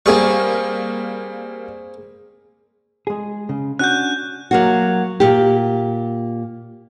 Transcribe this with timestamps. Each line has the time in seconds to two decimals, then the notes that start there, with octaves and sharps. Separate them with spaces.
0.06 G3 A#3 C4 G#4 C#6
3.07 G#3 G#4
3.49 C#3
3.79 C#4 D4 F#4 F#6 G6
4.51 F#3 A#3 F#4
5.20 A#2 G4